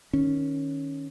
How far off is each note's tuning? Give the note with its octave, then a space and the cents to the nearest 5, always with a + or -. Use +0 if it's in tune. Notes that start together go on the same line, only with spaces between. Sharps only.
D#3 +0 C#4 +0